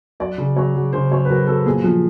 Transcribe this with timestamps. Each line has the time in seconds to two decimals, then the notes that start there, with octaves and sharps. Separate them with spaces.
0.20 F#3 D5
0.38 C#3
0.56 F#3 C#5
0.75 F#3
0.93 C#3 C5
1.11 F#3 C#5
1.25 B4
1.29 F#3 A#4
1.47 F#3 A4
1.66 A#2 G#4
1.84 F3